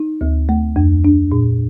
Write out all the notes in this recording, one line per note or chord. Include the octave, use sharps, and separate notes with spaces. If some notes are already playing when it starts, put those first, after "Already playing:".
Already playing: D#4
D2
A3
F2
D4
A#2